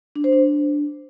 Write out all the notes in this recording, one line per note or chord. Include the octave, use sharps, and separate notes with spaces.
D4
C5
D4